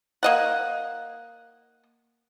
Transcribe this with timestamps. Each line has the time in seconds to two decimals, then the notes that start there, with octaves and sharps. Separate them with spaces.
0.23 A#3 D#5 F#5